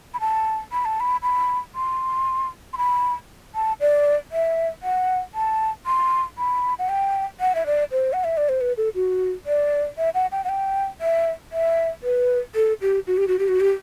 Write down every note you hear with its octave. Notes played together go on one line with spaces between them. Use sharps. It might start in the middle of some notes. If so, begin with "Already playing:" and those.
B5
A5
B5
A5
B5
B5
C6
C6
B5
A5
D5
E5
F#5
A5
C6
B5
F#5
G5
F#5
E5
D5
C5
F#5
E5
D5
C5
B4
A4
F#4
D5
E5
F#5
G5
F#5
G5
E5
E5
B4
A4
G4
F#4
G4
F#4
G4
F#4
G4